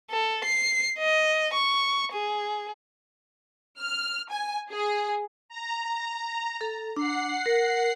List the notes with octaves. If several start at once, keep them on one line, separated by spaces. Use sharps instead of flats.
A4
C7
D#5
C#6
G#4
F6
G#5
G#4
A#5
A4
D4 F#5 C7
A#4